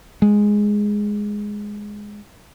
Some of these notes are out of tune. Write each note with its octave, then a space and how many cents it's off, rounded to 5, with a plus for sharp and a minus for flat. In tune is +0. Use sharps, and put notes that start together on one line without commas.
G#3 +0